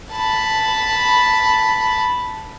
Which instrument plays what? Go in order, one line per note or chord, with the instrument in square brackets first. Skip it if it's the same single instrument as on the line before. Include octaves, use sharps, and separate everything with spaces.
[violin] A5 B5